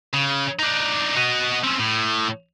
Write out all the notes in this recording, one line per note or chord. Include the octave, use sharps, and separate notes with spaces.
C#3
D4 D#4
F#4 D#5
C4 C#4
A2